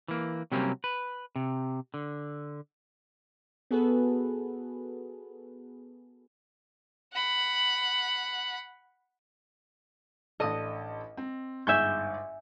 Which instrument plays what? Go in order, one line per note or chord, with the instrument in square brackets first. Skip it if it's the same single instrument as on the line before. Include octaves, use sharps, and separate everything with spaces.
[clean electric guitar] E3 A#3
C3 F#3 G3 A#3 C4 C#4
B4
C3
D3
[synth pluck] B3 F#4 G#4 A4 B4
[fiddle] F#5 B5
[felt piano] A1 D4 A4 [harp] D#5 D#6
[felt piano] C4
[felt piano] G1 G#2 C#6 [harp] E5 G#5 G6